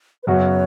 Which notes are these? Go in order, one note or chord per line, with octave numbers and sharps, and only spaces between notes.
B4
F#2 C#3 F#3 B3 F#4 C#5